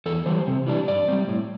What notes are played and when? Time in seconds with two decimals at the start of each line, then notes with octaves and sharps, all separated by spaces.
0.06 E2 A4
0.26 E3 G3 C5
0.47 C3
0.67 E3 G3 D4
0.88 G2 D5
1.08 G3 C4
1.28 A2